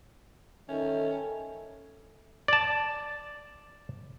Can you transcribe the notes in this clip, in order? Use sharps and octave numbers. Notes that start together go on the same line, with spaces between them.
D#3 C#4 A4 E5
D5 A5